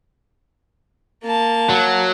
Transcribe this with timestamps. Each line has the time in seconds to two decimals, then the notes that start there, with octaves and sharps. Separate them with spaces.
1.24 A#3 A5
1.69 F#3